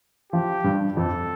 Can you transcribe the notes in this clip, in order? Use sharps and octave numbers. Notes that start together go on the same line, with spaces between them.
F3 G4
G2
F2 A4